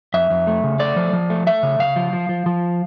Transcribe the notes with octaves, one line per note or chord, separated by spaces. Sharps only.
F2 E5
F2
A3
C#3
A3 D5
F3
F3
A3
A3 E5
C#3
C#3 F5
F3
F3
F3
F3